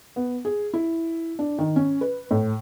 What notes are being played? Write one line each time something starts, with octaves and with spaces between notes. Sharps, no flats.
B3
G#4
E4
D4
D#3
C#4
B4
A2